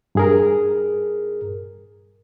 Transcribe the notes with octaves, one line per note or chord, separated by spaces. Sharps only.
G2 G#4 A#4